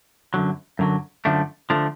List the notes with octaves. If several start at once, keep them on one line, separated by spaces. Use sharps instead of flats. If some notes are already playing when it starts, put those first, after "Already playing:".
F#2 D3 F#3
F#2 D3 F#3
F#2 D3 F3 A3 D4
D3 F3 A3 D4